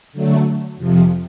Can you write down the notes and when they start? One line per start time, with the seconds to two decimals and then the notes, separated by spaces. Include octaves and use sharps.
0.13 D3 F#3 A3
0.77 F2 C3 F3